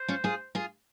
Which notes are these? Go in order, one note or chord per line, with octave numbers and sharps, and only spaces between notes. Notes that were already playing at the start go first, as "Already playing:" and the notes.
Already playing: C5
C#4 F4
F4 G#4
F4 G#4